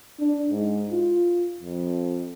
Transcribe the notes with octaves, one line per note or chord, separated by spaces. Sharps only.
D4
G#2
F4
F2